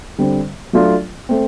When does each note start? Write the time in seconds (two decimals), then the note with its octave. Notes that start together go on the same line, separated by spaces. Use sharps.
0.18 D3 G3 C4
0.73 F#3 A3 D4 F4
1.29 A3 C4